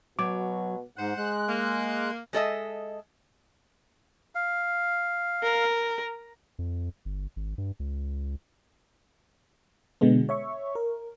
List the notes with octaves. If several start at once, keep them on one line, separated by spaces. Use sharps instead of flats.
B2 F#3 D6
G#2 C5 F#5
G#3 F#6
A#3
G#3 A4 D#5 E5
F5
A#4
F2
G1
G#1
G2
C#2
B2 D3 G#3 B3
C#5 E5 C#6
A#4